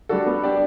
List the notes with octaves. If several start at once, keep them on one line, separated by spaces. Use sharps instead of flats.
G3 D4 F#4 A4
B3
D4 G4 D5